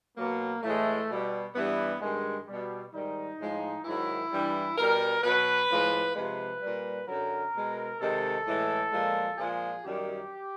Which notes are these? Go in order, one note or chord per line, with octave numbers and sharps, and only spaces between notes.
B2 F#3 A#3
A2 E3 G#3 A3
B2 G3
G2 E3 G3 B3
G2 D#3 G#3
B2 G3
G#2 D#3 G3 D#4
A2 F3 G#3
G#2 D#3 F#3 E4
G2 E3 G3
B2 G3 A#4
B2 F#3 B4
A2 F3 G#3
C3 F3 G#3 B4
A#2 G3
F#2 D3 F#3 A#4
B2 G#3
C3 D#3 G#3 A4
A2 E3 G#3
A#2 F3 G#3
A#2 F3 G#3 G#4
F#2 D#3 G3 G4